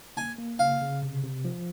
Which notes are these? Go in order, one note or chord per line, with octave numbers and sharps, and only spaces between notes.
A#3 G#5
A#3
C#3 F5
C#3
C3
C3
F3